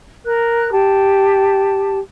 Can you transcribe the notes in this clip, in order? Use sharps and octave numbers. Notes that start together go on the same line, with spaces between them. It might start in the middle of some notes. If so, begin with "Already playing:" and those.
A#4 F#6
G4 A5